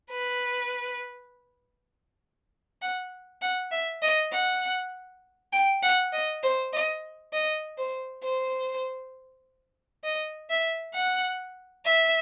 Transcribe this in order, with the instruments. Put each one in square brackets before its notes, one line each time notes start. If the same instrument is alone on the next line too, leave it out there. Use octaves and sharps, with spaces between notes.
[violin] B4
F#5
F#5
E5
D#5
F#5
G5
F#5
D#5
C5
D#5
D#5
C5
C5
D#5
E5
F#5
E5